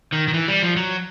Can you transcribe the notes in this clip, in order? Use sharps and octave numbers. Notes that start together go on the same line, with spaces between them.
D#3
D#3
E3
G3
F3
F#3